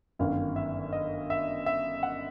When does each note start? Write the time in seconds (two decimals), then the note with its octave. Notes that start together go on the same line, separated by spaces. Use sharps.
0.19 G1 F#2 D#3 F5
0.56 E5
0.93 D#5
1.30 E5
1.66 E5
2.03 F#5